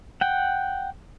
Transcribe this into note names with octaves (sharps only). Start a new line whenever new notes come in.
F#5 G5